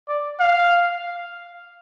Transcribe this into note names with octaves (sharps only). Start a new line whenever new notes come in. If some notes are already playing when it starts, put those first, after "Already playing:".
D5
F5